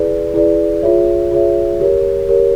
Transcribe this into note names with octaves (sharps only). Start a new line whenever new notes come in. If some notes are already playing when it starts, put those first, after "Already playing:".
Already playing: E4 G#4 B4 D5
E4 G#4 B4 D5
F4 G#4 C#5 E5
F4 G#4 C#5 E5
G4 A#4 C#5
G4 A#4 C#5